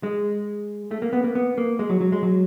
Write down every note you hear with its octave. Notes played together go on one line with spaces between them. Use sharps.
G#3
A3
A#3
B3
A#3
B3
A#3
G#3
F#3
F#3
G#3
F#3